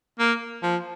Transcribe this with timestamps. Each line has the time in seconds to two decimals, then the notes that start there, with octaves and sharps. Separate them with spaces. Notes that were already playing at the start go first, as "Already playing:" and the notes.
0.19 A#3
0.63 F3